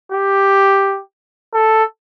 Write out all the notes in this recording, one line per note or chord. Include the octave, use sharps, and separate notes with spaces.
G4
A4